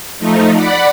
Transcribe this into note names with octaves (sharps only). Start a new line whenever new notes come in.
F3 A3 D#4
D5 F#5 B5